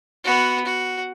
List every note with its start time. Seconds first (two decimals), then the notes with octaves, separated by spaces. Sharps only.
0.24 B3 F#4
0.65 F#4